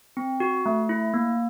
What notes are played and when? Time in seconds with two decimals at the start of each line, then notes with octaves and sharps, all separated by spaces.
0.17 C4
0.40 F#4
0.66 A3
0.89 E4
1.14 A#3